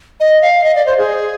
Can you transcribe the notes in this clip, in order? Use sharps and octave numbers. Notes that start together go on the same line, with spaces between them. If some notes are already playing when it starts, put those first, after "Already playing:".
D#5
F5
D#5
D5
C5
G#4